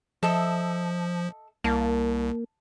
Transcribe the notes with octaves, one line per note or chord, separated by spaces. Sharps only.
F3 A4 D#5 E5
C2 A#3 A5